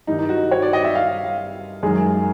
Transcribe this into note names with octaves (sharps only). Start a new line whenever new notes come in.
G2 D#3 G3 D#4
D#4
F#4
C#5
D5
D#5
E5
F5
F5
F#2 D#3 G#3